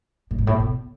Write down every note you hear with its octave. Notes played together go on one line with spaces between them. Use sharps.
A2
G#2
A2
B2